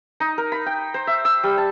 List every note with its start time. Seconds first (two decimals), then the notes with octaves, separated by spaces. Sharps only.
0.20 D#4
0.38 A#4
0.52 B5
0.66 G5
0.94 C5
1.07 E5
1.25 E6
1.44 G3
1.58 A5